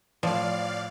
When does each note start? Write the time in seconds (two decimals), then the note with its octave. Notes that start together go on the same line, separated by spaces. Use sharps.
0.23 A2 F3 D5 F5